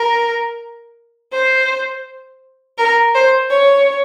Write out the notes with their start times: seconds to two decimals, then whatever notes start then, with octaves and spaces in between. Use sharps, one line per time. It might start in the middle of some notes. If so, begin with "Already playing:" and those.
Already playing: A#4
1.33 C5
2.78 A#4
3.15 C5
3.50 C#5